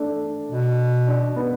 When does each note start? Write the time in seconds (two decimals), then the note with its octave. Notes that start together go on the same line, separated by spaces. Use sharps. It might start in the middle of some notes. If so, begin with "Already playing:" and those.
Already playing: A3 D4
0.48 B2
1.07 D4
1.36 B3